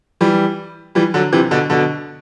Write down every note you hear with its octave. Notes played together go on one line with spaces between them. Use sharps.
E3 G3
E3 G3
D3 F#3
C3 E3
B2 D3
B2 D3